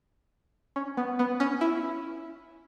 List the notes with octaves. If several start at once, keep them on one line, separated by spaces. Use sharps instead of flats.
C#4
B3
B3
C#4
E4